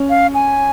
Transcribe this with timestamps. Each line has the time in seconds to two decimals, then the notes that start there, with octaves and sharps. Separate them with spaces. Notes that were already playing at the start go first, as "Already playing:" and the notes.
Already playing: C#4
0.10 F5
0.34 G#5